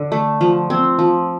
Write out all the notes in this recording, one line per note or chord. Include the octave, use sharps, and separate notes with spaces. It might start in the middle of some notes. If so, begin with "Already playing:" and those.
Already playing: D3
A3
F3
C4
F3